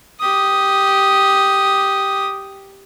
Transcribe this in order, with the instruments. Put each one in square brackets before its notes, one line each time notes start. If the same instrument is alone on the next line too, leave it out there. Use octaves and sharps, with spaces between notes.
[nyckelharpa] G4 D#6